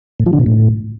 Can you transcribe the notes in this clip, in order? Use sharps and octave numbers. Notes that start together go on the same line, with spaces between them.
A2
F3
D3
B2
A2